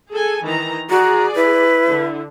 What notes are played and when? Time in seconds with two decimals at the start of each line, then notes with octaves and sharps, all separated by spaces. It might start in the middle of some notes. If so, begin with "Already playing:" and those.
0.13 G#4 A4 G#5
0.43 D#3 E3 A#5
0.90 F#4 G#4 D5 A#5
1.35 E4 B4
1.89 D3